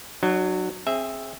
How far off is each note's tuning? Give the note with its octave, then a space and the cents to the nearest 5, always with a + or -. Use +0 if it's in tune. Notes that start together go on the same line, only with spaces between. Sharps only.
F#3 +0 D#4 -45
C4 +25 G#4 +0 E5 +0